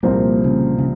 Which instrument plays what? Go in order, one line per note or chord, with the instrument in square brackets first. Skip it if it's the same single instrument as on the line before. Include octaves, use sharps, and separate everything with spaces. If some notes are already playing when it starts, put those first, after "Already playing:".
[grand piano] C2 A#2 F3 C4 [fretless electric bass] A#3
[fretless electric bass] C#3
C#3